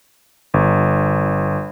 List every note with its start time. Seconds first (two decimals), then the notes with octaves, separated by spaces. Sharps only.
0.54 G1